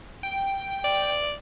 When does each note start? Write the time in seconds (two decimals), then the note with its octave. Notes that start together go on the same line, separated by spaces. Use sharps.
0.23 G5
0.84 D5